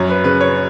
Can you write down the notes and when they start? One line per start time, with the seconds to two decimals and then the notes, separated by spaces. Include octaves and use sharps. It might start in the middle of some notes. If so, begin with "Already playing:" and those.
Already playing: F#2 C#5
0.09 B4
0.24 C#3 B4
0.41 C#5